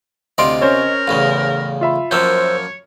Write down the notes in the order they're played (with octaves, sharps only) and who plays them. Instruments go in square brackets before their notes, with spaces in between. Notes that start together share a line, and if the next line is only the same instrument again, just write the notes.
[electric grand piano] D2 C6 D7 [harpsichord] C3 F4 D5 [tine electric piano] D#5
[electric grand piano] C#4 C5 C#5 [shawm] A#4
[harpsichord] A1 E2 C#3 [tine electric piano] F5
[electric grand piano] F4 E5 B5
[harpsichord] F#2 F3 A#3 [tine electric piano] C5 E6 G6 [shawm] C#5